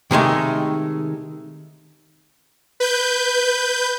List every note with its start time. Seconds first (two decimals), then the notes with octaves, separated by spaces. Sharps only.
0.11 C3 D#3 G#3 A3
2.80 B4 G6